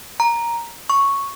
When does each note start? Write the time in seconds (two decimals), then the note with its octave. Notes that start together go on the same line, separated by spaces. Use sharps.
0.20 A#5
0.90 C#6